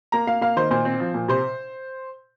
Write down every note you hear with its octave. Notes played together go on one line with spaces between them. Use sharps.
A#3 A#5
A#3 F5
A#3 F5
D#3 C5
A#2 C5
C4
F3
A#2
C3 C5